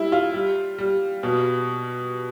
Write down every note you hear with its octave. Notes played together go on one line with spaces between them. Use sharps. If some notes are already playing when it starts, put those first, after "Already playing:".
Already playing: G3 E4
F4
G3
G3
B2